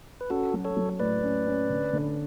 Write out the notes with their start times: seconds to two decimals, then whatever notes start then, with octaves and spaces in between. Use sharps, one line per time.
0.21 B4
0.30 C#4 F#4 A4
0.53 F#3
0.65 A4 C#5
0.77 F#3
1.00 A2 B4 D5
1.23 C#4
1.47 C#4
1.70 D3
1.93 D3